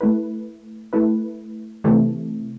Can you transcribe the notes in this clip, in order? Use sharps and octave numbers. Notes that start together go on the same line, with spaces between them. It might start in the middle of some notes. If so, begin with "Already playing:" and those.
A3 E4 B4
A3 E4 B4
C3 E3 A3